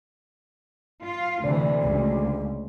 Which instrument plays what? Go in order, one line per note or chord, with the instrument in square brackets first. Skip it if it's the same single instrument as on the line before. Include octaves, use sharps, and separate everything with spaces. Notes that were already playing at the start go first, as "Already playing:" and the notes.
[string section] F4
[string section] D2 [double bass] C3 E3 [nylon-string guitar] D5
[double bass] C#2